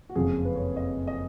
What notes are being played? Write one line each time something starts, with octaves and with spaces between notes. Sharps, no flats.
F#4
F#1 F2 F3 G#4
B4
C#5
D#5
D#5